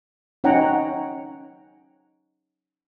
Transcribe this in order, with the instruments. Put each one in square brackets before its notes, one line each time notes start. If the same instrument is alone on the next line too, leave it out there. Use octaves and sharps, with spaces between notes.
[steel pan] C#4 D#4 C#5 F#5 G5 A#5